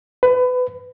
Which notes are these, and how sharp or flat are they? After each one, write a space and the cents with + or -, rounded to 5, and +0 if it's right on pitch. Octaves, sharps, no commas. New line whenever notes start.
B4 +25